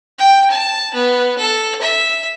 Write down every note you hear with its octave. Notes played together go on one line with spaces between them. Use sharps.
G5
A5
B3
A4
E5